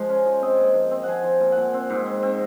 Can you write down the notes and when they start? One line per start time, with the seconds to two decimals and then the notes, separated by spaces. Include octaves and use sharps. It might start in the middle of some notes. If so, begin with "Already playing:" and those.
Already playing: F3 G#3
0.09 C#4
0.26 F3
0.42 C4 D#5
0.58 A#2
0.64 D#5
0.74 F3
0.91 C4
1.03 F3 F#5 G#5
1.23 F3
1.40 A#2
1.52 F#5
1.57 A#2
1.74 C4
1.90 G#2
2.06 C4
2.23 C4